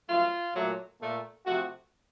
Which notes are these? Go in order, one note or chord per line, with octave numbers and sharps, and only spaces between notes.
F#2 F3 A3 F4
A#2 F#3 A3
A#2 A3
C3 F3 A3 F#4